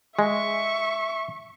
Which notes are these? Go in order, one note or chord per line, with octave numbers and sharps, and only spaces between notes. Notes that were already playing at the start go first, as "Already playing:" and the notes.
G#3 E5 C#6